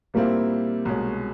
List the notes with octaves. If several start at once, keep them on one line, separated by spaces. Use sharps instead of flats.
A#2 G3 A#3 C4 E4
C2 B2 G#3 C#4